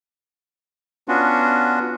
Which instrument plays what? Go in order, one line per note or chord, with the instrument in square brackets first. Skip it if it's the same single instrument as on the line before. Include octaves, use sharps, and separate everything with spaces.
[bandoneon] B3 C#4 D4 F4 F#4